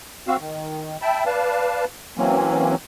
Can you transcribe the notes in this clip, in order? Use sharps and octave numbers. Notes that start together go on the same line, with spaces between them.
C4 F#4 F5 E6
D#3
E5 G5 A5 B5
B4 D5 F5 A5
E3 F#3 A#3 C4 C#4